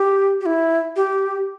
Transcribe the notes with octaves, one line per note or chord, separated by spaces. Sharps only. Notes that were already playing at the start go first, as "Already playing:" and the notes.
Already playing: G4
G4
E4
G4